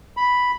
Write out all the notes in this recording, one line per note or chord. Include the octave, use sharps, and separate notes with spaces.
B5